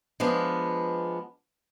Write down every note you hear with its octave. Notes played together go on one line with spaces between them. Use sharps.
F3 G#3 B3 D4